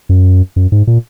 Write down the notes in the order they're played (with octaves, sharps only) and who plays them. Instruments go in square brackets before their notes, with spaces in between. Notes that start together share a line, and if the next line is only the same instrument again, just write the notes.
[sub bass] F#2
F#2
G#2
A#2